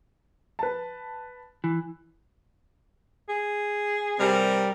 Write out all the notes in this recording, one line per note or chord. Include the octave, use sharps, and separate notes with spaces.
B4 A5
E3
G#4
C3 G3 A#4